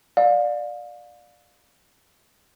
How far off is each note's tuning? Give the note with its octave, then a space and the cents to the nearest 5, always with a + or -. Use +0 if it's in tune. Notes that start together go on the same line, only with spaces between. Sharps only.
D5 +15 F5 +25